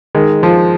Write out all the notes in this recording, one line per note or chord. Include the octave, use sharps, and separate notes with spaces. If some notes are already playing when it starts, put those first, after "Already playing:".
D#3 G#3
F3